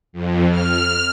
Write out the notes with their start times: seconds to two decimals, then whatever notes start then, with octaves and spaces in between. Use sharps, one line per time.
0.13 F2
0.51 F6